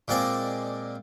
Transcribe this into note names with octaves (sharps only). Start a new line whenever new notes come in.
A#2 G#3 C4 D5